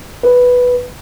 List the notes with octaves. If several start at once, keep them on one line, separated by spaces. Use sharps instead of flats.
B4